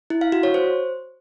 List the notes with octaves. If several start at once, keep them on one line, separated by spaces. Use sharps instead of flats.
E4
F5
F#4
C#5
C5